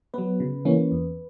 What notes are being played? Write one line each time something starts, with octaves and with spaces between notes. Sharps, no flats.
F#3 B3 B4
C#3
E3 A#3 C#4
E2